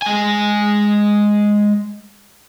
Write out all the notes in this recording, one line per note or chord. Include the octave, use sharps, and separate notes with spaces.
G#3 G#5